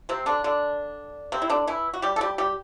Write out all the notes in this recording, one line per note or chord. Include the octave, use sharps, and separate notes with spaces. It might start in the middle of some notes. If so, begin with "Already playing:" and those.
C3 C4
D3 D4
D3 D4
C3 C4
E4
D3 D4
E3 E4
F#4
G3 G4
A4
G3 G4
G3 G4